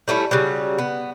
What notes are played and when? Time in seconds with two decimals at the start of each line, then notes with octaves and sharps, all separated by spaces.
0.08 G3 A3 C#4 E4
0.31 C#3 F#3 G3
0.78 B3